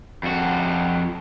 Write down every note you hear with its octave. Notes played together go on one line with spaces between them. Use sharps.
F2 F#4